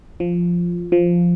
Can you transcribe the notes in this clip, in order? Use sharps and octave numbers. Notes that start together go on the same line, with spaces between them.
F3
F3